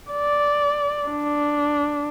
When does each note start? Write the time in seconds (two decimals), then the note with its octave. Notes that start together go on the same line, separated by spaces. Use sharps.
0.12 D5
1.08 D4